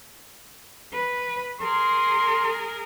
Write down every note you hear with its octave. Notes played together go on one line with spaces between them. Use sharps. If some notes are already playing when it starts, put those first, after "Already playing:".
B4
G#4 A#4 C6